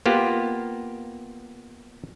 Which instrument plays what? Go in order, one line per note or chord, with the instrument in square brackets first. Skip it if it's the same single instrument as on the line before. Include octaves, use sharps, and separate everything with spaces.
[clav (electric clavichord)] A#3 B3 F4 G4